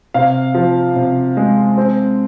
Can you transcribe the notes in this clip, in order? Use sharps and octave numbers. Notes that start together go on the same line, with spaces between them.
C3 F5
F3
C3
G#3
C4